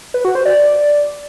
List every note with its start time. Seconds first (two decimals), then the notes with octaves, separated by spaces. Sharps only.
0.14 B4
0.25 F#4
0.35 C5
0.45 D5